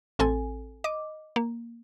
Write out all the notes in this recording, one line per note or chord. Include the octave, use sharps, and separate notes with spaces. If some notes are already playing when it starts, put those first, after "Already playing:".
A1 C4 A4 G#5
D#5 D6
A#3